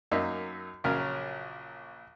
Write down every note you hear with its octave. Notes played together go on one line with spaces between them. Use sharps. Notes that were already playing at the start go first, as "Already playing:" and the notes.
F#2 A#3 D#4 E5
A#1 C#3 F#3 A#4 F5